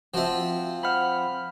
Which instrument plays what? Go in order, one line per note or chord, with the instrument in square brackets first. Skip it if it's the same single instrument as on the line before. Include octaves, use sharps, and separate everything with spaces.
[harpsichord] F3 C4 [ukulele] F#4 E5
[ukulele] C5 F#5 [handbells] B5 F6